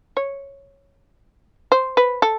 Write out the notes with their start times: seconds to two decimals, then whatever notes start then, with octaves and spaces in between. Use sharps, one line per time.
0.17 C#5
1.72 C5
1.97 B4
2.22 A4